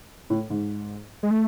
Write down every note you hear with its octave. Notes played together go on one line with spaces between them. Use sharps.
A2
G#2
G#3
A3